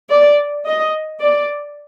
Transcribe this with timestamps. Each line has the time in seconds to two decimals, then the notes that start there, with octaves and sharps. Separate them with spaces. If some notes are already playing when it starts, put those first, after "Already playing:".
0.10 D5
0.66 D#5
1.20 D5